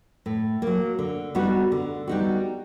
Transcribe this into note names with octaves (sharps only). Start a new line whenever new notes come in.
A2
F#3 A#3
D3
G3 B3 D#4 F#4
D3
G3 B3 D#4 F#4